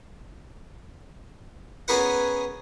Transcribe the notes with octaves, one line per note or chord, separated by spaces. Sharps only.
B3 C#4 G#4 A#4 B4 F#5